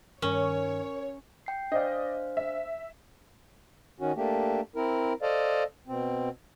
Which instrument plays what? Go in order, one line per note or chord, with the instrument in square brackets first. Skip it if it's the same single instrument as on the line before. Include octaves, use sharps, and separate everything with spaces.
[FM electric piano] G2 D#3 [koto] C#4 [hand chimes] A#4 [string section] C#5
[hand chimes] G5 C7
[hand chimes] D4 C5 F5 [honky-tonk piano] D5 D#5
[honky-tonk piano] E5
[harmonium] D#3 C#4 F#4
A3 A#3 D4 G4
C4 E4 A#4
A4 C5 D5 D#5 F5
B2 C4